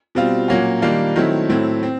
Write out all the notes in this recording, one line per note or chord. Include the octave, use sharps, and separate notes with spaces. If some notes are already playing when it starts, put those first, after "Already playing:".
B2 G3 C4 F4
A#2 F#3 A#3 C#4 F#4
D#3 G3 A#3 D4 F4
D#3 F#3 A3 C4 E4
A2 F#3 A3 C4 E4
C4